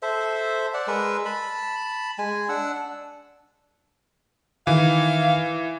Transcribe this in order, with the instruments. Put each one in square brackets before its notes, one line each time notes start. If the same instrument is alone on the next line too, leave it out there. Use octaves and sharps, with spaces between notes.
[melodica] A4 C5 E5
D5 F#5 A5
G#3 A#4 B4 E6
A5 B5
G#3 G#5
D4 F#5 E6
[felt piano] D#3 [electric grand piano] E3 [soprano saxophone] F5